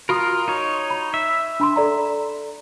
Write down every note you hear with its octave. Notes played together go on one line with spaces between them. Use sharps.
F4 F#4 A#4 B5 D#6
D#4 C#5
B5
E5
D4 B5 C6
A4 D5 A#5